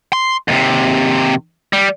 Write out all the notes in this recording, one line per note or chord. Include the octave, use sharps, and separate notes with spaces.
C6
D#2 C3
G3